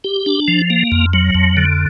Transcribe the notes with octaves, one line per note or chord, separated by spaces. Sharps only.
G4
D4
F3
A#3
F2
F#3
F2
D3